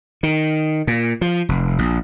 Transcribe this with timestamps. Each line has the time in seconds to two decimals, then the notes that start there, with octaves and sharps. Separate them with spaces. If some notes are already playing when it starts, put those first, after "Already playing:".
0.23 D#3
0.87 A#2
1.21 F3
1.49 F1
1.79 A#1